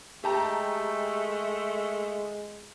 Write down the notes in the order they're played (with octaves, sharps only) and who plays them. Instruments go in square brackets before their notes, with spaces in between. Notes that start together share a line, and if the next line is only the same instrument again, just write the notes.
[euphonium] G#3 [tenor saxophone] A3 [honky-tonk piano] G4 A5 A#5